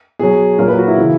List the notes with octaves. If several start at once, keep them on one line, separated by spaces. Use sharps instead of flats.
B2 F#3 G#4
A#2 F#3 A#4
B4
F#4
E4
C#3 E3